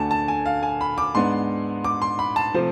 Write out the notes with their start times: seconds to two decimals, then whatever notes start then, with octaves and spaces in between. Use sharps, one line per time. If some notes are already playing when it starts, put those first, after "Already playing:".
Already playing: D2 D3 A3 D4 G#5 A5
0.11 A5
0.28 G#5
0.46 F5
0.63 G#5
0.81 B5
0.98 D6
1.15 G#2 G#3 B3 D4 C6
1.84 D6
2.02 C6
2.19 B5
2.36 A5
2.54 C3 F3 A3 C5